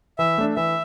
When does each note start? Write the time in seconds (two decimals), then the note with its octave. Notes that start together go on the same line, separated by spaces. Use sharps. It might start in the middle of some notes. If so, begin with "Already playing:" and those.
0.18 E3 E5
0.38 A3 D4
0.56 E3 E5